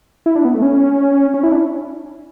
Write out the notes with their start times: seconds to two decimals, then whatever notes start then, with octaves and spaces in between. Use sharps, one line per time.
0.26 E4
0.36 D4
0.45 B3
0.54 A3
0.62 C#4
1.34 C#4
1.43 E4
1.52 D4